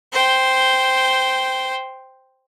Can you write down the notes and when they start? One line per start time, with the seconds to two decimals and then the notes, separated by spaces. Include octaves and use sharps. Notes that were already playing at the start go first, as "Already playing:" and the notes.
0.13 C5 G5